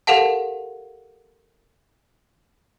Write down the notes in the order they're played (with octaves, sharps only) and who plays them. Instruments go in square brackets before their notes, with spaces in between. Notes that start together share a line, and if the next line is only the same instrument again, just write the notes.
[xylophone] G4 A4 A#4 F5 F#5 A5